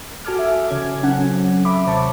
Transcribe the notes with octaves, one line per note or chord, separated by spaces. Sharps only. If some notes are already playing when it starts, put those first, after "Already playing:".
F#4 A4 G#5 D6 F6
E5
C#3 C#4 G#6
F#3 C4 C#4 A4 F#5
E5 B5 D6
D#2 C3 C5 C#5 A5 C#6